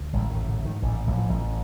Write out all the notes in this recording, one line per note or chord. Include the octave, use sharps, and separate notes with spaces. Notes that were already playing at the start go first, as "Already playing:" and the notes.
Already playing: D2
A1 G#3
D#3
G#2
D3
G#2
D#3
A1 E3
A1
F3
A1